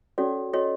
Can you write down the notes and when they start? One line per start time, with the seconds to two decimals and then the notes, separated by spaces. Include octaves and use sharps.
0.18 C#4 F#4 A4 C#5 D5
0.53 F#4 A4 C#5 D#5